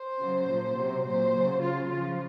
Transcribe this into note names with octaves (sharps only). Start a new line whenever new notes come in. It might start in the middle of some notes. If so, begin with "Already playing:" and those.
Already playing: C5
C#3 F#3
A#2 F3
C3 F#3
A#2 F#3 C5
C#3 F#3
C#3 F#3 F4
C#3 F3 F4